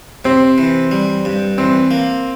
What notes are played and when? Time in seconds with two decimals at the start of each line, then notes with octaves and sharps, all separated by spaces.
0.25 C3 C4
0.58 E3
0.91 G3
1.25 G2
1.58 E3 C4
1.91 A#3